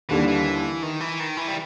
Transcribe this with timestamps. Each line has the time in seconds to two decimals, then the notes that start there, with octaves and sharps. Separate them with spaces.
0.09 D#2 D3 E3 G3
0.28 E3
0.83 D#3
1.00 E3
1.20 D#3
1.37 E3
1.48 G3